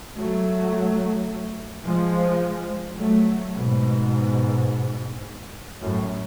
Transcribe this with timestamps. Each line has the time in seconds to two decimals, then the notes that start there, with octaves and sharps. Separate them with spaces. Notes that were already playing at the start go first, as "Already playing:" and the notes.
0.16 F#3 A3
1.85 F3 G#3
2.98 F#3 A3
3.55 G#2 B2
5.81 F#2 A2